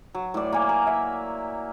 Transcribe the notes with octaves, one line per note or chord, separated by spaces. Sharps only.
F#3
A2 D5
A#3 G#5
A#4
E5